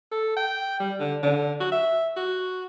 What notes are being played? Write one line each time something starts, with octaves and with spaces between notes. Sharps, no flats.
A4
G5
G3
D3
D3
F#4
E5
F#4